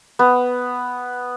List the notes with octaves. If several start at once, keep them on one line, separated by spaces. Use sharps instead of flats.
B3